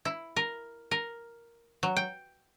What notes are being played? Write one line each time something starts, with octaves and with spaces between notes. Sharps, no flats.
E4
A#4
A#4
F#3
G5